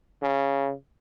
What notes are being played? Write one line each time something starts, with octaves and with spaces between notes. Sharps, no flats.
C#3